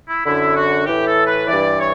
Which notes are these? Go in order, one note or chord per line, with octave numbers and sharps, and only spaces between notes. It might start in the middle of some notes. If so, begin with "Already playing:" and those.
E4
F#2 D3 E4
F#4
A2 E3 G4
A4
B4
G2 E3 D5
C#5